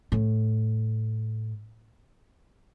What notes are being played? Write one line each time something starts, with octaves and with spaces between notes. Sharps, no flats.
A2